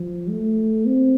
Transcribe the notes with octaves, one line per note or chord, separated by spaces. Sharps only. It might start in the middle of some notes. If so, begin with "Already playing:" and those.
Already playing: F3
A3
C4